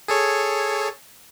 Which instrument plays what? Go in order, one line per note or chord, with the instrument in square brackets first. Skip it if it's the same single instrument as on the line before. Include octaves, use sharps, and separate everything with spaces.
[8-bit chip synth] G#4 A4 C#5